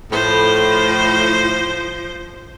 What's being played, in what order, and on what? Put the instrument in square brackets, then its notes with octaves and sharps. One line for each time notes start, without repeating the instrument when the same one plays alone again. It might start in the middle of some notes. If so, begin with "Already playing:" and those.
[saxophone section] A2 [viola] F3 C5